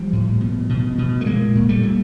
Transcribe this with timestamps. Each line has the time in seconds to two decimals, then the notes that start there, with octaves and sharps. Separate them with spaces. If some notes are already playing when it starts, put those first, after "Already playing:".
Already playing: F3 G3
0.13 A2
0.40 B2
0.69 B2
0.98 B2
1.21 A3
1.26 A#2 G#3 A#3
1.55 A#2
1.69 G3 A3
1.83 A#2